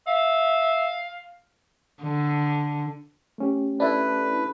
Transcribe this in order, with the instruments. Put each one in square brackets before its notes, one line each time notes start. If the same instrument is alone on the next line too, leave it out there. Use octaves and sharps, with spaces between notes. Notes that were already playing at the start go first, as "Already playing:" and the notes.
[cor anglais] E5 [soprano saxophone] F5
[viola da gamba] D3
[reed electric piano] A3 C#4 G4
[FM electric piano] D4 E4 A4 [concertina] B4